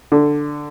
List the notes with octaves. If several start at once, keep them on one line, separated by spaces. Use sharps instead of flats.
D3